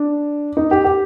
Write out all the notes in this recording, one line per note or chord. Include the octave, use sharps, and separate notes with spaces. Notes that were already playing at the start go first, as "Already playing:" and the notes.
Already playing: D4
D#4
G4
G4